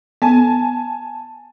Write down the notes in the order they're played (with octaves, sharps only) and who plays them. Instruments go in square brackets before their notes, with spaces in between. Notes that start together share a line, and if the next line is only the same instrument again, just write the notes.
[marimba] B3 [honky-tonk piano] G#5 A5